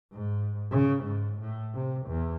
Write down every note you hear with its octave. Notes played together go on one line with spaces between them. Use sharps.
G#2
C#3
G#2
A2
C3
E2